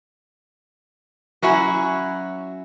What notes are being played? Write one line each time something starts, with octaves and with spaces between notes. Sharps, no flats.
F#3 C#4 E4 F#4